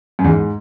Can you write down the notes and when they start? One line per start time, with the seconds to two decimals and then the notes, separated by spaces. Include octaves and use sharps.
0.19 F#2
0.24 E2
0.29 G#2